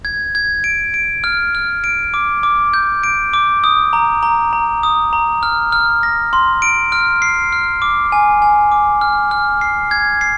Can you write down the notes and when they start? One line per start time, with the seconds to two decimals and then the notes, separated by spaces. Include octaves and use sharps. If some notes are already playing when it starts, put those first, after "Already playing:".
0.05 G#6
0.35 G#6
0.64 D7
0.94 D7
1.24 F6
1.55 F6
1.84 D7
2.14 D6
2.43 D6
2.74 G6
3.04 D7
3.34 D6
3.64 D#6
3.93 A#5
4.23 A#5
4.53 A#5
4.83 D#6
5.13 A#5
5.43 F6
5.72 F6
6.03 A#6
6.33 C6
6.62 D7
6.92 F6
7.22 C7
7.53 F6
7.82 D6
8.12 G#5
8.42 G#5
8.72 D6
9.01 F6
9.31 F6
9.61 C7
9.91 G#6
10.21 C7